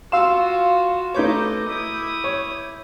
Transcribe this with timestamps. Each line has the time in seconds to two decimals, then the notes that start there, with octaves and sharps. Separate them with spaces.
0.12 F4 F#4 F5 C6 E6 E7
1.14 A3 D#4 B4 C#5 D#5 D6 G6
1.69 E4 D#6
2.24 C#5